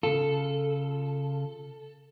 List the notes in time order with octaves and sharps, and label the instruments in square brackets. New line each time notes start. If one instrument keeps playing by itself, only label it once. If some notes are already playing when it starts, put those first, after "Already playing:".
[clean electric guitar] C#3 F4 [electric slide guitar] A4